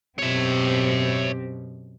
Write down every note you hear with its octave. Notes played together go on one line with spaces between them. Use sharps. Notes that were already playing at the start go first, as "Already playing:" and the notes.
F#2 B2 C4 G4 C#5 E5